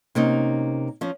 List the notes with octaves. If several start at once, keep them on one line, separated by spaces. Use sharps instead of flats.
C3 A#3 C#4 D#4
F3 C#4